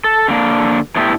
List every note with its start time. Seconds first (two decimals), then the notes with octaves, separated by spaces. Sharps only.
0.04 A4
0.28 D3 A#3 D4
0.96 A2 B3 D4 E4 G4